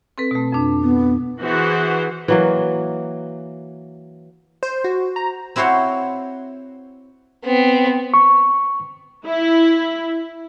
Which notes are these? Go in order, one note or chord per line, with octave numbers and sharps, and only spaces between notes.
C4 A4 B4
B2 A3
F2 D4
B3
E3 F#4 G#4 C5
E3 F#3 A#3
C5
F#4
A#5
C4 E4 F#4 C5 C#5 F5
B3 C4
C#6
E4